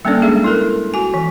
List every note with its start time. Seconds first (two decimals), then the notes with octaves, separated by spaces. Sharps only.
0.05 G3 A#3 C#4 D4 A4 D5
0.22 G#3 G#4 E5
0.44 E4 A4 A#4
0.94 F#4 G#5
1.14 E3